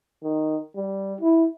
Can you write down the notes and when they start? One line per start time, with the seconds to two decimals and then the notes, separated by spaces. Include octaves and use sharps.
0.23 D#3
0.76 G3
1.21 E4